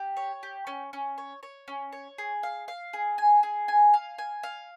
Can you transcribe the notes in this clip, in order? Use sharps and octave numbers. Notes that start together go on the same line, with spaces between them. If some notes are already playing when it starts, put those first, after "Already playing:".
Already playing: G4
C#5
G4
C#4
C#4
C#5
C#5
C#4
C#5
G#4
F5
F5
G#4
G#5
G#4
G#5
F5
G#5
F5